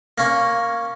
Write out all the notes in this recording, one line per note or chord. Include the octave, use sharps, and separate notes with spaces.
A#3 C#4